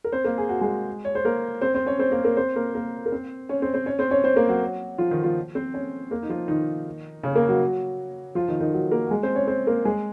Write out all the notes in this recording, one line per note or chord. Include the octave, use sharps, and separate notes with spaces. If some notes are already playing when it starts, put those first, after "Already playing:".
A#4
C4 C5
A#3 A#4
G#4
F#4
G#3 G#4
C#5
C5
A#3 A#4
C4 C5
C4 C5
C#4 C#5
C4 C5
A#3 A#4
A#3 A#4
C4 C5
A#3 A#4
A#3 A#4
A#4
C4 C5
C#4 C#5
C4 C5
C4 C5
C#4 C#5
C4 C5
C#4 C#5
C4 C5
A#3 A#4
F#3 F#4
F3 F4
D#3 D#4
F3 F4
C4 C5
C#4 C#5
A#3 A#4
D#4
F3 F4
D#3 D#4
C#3 C#4
A#3 A#4
F#3 F#4
F3 F4
D#3 D#4
D#3 D#4
F#3 F#4
A#3 A#4
F#4
G#3 G#4
C4 C5
C#4 C#5
C4 C5
A#3 A#4
G#3 G#4